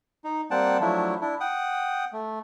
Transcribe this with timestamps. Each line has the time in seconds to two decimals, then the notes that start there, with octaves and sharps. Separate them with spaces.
0.24 D#4
0.51 G3 A#3 C4 F#5 G5 A5
0.81 F3 F#3 A3 D4 E4
1.21 D4 E4
1.40 F#5 G5 D#6
2.13 A3